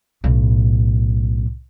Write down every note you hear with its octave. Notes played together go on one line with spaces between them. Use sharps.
B1 A2